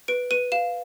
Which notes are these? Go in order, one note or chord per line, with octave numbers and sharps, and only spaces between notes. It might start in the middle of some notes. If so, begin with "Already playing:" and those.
B4 D7
B4 D#7
F5 E7